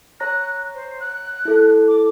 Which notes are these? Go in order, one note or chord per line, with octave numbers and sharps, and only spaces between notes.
C#5 A#5 F#6 A#6
C5
F#6
E4 A4
D6